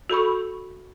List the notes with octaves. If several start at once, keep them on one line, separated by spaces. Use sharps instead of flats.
F#4 A4 B5 C#6